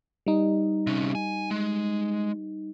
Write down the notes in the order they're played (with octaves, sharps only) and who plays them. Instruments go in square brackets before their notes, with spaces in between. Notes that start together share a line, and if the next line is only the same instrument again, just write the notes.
[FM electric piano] G3 D#4
[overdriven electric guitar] C3 C#4
G#5
G#3